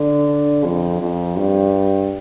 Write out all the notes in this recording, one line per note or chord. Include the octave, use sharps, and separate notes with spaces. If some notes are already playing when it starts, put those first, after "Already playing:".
Already playing: D3
F2
F2
G2